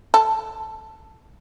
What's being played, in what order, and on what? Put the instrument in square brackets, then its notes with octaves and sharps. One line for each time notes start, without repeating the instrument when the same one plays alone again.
[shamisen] A4